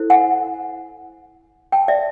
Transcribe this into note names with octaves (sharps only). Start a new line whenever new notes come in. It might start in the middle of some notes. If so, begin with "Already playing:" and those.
Already playing: E4 A4 C5
F#5 G#5
G5 A5
D5 E5